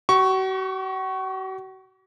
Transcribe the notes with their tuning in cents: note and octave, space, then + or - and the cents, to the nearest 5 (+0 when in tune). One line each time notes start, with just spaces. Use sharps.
F#4 +40 C#6 +0